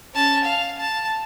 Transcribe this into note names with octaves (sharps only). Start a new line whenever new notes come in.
C#4 A5
F5
A5